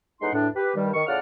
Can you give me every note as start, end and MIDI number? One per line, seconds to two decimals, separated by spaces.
0.21 0.33 40
0.21 0.33 45
0.21 0.33 56
0.21 0.33 63
0.21 0.33 78
0.21 0.33 84
0.33 0.48 40
0.33 0.48 45
0.33 0.48 62
0.56 0.72 67
0.56 0.72 71
0.76 0.91 43
0.76 0.91 51
0.76 0.91 55
0.94 1.03 51
0.94 1.03 85
1.07 1.19 45
1.07 1.19 49
1.07 1.19 65
1.07 1.19 74
1.07 1.19 78
1.07 1.19 89